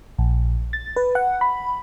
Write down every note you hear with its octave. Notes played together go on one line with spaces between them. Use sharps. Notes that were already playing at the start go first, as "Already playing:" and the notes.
A#1
A6
B4
F#5
B5